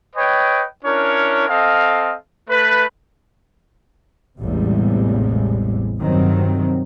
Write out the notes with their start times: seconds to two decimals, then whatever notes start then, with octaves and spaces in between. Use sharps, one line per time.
0.16 B4 C#5 D#5 G5
0.84 C#4 D4 E4 A#4 C#5
1.48 C4 A4 D#5 F5
2.48 A3 B4
4.40 A1 E2 A2 C3 G3 G#3
6.00 G2 C3 D#3 F#3 C4